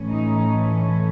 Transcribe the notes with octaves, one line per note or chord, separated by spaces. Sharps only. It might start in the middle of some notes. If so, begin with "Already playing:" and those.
Already playing: A2 E3 A3 C#4
D#4